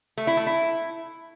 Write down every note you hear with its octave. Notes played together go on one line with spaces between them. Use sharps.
A3
E4
A3
E4